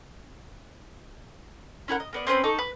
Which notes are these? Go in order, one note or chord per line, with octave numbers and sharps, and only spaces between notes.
C#4 E4 A#4 F#5
D#5
A#3 B3 D5
C4 C#4 B4 C5
D#4 A4 C#6 D6
B4